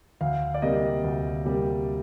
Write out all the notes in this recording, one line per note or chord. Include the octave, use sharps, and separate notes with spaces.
D2 F5
D5
C3 G3 A#3 D#5
D2
C3 G3 A#3